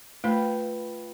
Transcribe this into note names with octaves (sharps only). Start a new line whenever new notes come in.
A3 F4 B4 G5